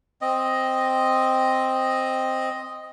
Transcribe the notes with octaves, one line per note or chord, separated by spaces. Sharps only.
C4 D#5